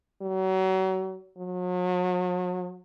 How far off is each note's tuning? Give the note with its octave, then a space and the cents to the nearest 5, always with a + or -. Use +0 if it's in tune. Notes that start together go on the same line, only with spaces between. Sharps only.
F#3 +35
F#3 -40